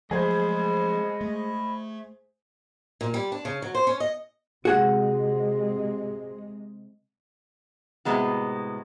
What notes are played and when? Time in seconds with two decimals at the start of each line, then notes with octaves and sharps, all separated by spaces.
0.11 F3 F#3 G#3 A3 G#4 C5 D#5 B5
1.21 A3
3.01 A#2
3.14 G3
3.32 D4
3.45 C#3
3.62 F#3
3.75 C5
3.87 C#4
4.00 D#5
4.65 C3 G#3 F#4 G#4 F#5
8.05 A2 C3 G#3 B3 F#4